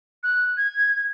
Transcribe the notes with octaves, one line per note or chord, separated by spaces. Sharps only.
F#6
G#6